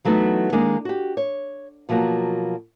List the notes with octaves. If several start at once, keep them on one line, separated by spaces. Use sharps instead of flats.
E3 F#3 A3 B3 D#4
D#3 G#3 A#3 D4
F#4 G4
C#5
B2 F3 F#3 A#3 F#4